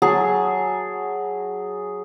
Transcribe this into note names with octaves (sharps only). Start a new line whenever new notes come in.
F#3 G#4 G#5 A5